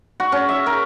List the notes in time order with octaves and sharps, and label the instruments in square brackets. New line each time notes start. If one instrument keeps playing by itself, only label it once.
[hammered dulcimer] F#4
C#4
E5
A#4